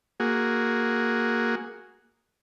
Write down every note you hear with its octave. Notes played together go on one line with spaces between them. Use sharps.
A#3 F#4 G#4